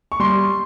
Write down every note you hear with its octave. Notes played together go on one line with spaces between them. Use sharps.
C#6
G3 C6